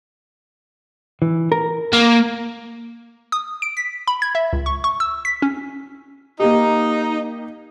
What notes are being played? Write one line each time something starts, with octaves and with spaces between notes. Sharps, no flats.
E3
A#4
A#3
D#6
D7
B6
B5
G#6
E5
C#2
C#6
C#6
E6
B6
C#4
A#3 D#4 G4